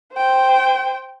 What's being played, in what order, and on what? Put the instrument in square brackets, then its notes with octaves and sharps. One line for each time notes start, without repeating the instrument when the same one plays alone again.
[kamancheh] C5 G5